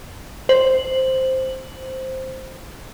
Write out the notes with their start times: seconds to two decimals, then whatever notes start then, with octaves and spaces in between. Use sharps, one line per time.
0.49 C5 F#7